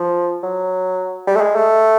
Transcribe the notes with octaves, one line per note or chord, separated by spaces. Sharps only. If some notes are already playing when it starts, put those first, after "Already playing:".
Already playing: F3
F#3
G3
A3
G#3
A3